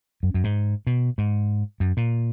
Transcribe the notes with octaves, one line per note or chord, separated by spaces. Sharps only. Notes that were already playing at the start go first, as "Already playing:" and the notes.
F#2
F#2
G#2
B2
G#2
F#2
A#2